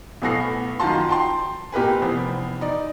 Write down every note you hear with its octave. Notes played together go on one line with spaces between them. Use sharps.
B1 A2 B3 A4 A#6 C7
F#2 D#3 F4 F#4 A5 C6
G5 A5 C6
A#2 G4 A#4 B4 G#5
F1 E3 B3 C5
D#4 D5